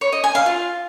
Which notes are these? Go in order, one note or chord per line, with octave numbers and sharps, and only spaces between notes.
C#5
D#5
G#5
F5
F4